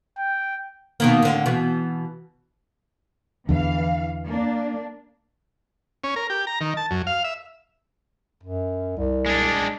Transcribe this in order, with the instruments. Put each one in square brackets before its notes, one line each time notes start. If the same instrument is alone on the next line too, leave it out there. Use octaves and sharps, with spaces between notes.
[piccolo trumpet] G5
[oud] B2 D#3 A#3
A2 D3
B2 E3
[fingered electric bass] E2 D3 [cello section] E3 F5
[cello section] A#3 D4
[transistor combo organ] C#4
A#4
G4
A#5
D#3
A5
F#2
F5
E5
[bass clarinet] F#2
C2
[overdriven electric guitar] G#3 D4